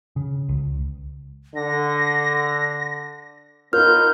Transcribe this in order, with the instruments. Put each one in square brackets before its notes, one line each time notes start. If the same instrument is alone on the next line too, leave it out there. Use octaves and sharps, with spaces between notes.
[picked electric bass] C#3
C#2
[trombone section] D3 [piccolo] A#6
[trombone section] B3 D#4 F4 [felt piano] A#4 [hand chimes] F6 [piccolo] G6